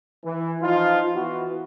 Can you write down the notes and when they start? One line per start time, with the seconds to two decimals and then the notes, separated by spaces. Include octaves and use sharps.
0.24 E3
0.62 F3 D#4 F4
1.15 E3 B3 F#4